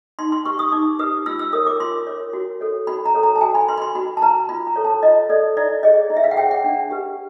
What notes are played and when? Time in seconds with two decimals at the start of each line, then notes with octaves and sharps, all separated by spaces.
0.19 D#4 C6
0.32 C6
0.45 G4 B4 C#6
0.59 D#6
0.72 D#4 D6
0.99 G4 B4 D#6
1.26 F4 E6
1.39 E6
1.53 A#4 C#5 D#6
1.67 D6
1.80 F4 C6
2.07 A#4 C#5
2.33 F#4
2.61 A4 C#5
2.87 F#4 B5
3.06 A#5
3.14 A4 C#5
3.23 A#5
3.36 A5
3.41 F#4 G#5
3.55 B5
3.68 B4 C6
3.78 B5
3.82 C6
3.95 F#4 B5
4.17 A5
4.22 B4 A#5
4.49 F4 B5
4.67 A#5
4.76 A4 C#5
4.84 A5
5.03 F4 D#5
5.29 A4 C#5 D5
5.57 E4 D5
5.83 G#4 C#5 D#5
6.10 E4
6.17 E5
6.24 F5
6.31 F#5
6.37 G#4 C#5 G5
6.51 F#5
6.64 D4
6.91 G4 B4